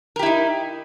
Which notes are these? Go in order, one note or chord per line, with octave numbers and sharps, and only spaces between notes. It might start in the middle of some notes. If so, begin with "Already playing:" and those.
D#4 E4 G4 A#4